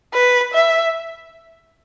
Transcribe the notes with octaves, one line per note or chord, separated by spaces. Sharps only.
B4
E5